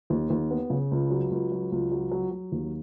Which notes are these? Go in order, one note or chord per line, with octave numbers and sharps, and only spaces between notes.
D#2
D#2
B3
C#3
C#2
F#3
C#2
F#3
C#2
F#3
F#3
F#3
D#2